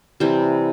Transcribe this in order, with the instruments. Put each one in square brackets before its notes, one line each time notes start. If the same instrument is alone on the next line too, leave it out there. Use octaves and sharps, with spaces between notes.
[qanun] C3 E3 G3 C5